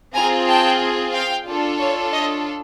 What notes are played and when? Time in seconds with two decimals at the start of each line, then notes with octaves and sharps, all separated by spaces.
0.14 C4 F4 G#4 G#5 A#5
0.48 G5 A5
1.13 F5 G5
1.46 D4 F4 A4
1.80 C#5
2.13 C#5 D#5